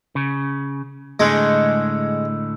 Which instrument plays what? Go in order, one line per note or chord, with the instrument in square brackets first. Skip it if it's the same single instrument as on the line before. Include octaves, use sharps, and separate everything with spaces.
[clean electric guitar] C#3
[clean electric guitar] A2 D3 [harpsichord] G#3